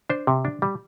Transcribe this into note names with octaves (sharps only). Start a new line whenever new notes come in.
D4 C5
C3
D4
G3